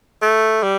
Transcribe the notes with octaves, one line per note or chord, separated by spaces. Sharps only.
A3
G3